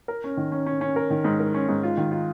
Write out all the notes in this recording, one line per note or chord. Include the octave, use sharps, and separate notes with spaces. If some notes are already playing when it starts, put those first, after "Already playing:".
A#4
C#4
D#3
C#4
C#4
C#4
A#4
D#3
G#2
A#4
C#4
G#2
F4
D#3
F4